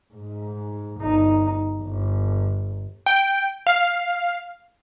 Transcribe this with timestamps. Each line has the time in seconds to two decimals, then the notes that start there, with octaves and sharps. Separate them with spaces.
0.14 G#2
1.01 G1 D#4
1.83 G1
3.06 G5
3.67 F5